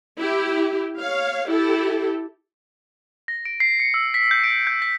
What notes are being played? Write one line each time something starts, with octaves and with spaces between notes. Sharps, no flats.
E4 G4
C#5 F5
E4 G4 A4
A#6
D7
C7
C#7
E6
B6
G6
D7
G6
B6